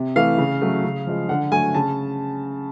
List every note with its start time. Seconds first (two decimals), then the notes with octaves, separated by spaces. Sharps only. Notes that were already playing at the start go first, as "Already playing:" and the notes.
Already playing: C3
0.16 E3 A3 F5
0.38 C#3
0.62 F#3 A3
0.84 C#3
1.06 F3 G#3
1.29 D3 F#5
1.52 F#3 A3 G#5
1.74 C#3 A5